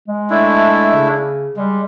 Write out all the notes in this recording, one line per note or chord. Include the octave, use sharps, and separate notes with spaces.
G#3
A3 D4 E4
C#3
G3 G#3